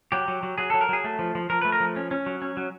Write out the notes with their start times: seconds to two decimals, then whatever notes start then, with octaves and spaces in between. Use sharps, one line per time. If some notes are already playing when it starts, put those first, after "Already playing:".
0.12 F#3 G4
0.28 F#3
0.43 F#3
0.58 F#3 G#4
0.70 F#3 A4
0.81 A#4
0.89 F#3 G#4
1.04 A3
1.19 F3
1.35 F3
1.50 F3 A#4
1.62 A3 B4
1.72 A#4
1.80 F3
1.96 C#4
2.11 C#4
2.26 F#3
2.42 C#4
2.57 F#3